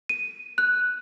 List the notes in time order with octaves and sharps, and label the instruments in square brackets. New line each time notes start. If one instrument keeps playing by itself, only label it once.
[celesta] D#7
F#6